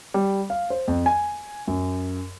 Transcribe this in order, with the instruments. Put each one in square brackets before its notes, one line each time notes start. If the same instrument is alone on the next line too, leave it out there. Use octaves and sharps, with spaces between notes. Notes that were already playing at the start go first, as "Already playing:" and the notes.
[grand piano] G3
F5
C5
F2
G#5
F#2